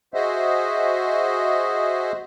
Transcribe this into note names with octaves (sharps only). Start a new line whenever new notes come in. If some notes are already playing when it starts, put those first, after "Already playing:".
F#4 G#4 C5 D#5 E5